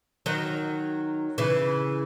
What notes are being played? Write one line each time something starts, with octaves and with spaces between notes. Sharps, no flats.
D#3 F#3
C#3 E3